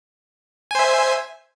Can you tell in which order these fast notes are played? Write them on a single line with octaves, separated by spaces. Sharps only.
G#5 C5 E5